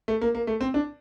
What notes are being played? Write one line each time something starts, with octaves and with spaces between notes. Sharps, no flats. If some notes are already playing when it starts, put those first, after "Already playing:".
A3
A#3
A#3
A3
C4
D4